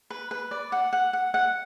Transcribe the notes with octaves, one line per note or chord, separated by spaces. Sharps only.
B4
B4
D5
F#5
F#5
F#5
F#5